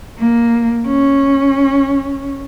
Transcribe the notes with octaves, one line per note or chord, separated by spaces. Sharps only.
A#3
C#4